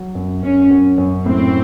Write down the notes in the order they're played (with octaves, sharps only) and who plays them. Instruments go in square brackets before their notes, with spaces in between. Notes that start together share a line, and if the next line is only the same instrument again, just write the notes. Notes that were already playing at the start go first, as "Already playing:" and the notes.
Already playing: [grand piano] F#3
F#2
[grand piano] F#2 [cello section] C#4
[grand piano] F#2
F#2
[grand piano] A2 [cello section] C4